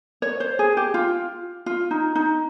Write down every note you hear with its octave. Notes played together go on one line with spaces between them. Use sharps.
C#5
C5
G#4
G4
F4
F4
D#4
D#4